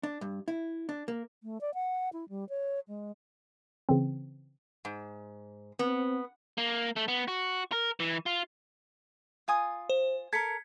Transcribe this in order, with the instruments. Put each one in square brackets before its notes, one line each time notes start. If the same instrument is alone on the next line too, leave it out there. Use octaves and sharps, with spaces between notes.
[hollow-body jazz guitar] D4
G2
E4
D4
A#3
[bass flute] A3
D5
F#5
E4
G3
C#5
G#3
[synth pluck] C#3 E3 C4
[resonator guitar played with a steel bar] G#2
[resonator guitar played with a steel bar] B3 [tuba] C4
[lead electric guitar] A#3
A3
B3
F#4
A#4
E3
F4
[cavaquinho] F4 G#5 D#6
[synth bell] C5
[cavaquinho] A4 A#4 [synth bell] G#6 B6 C#7